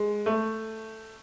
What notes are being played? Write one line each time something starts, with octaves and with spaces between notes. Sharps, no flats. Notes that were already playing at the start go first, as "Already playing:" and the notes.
Already playing: G#3
A3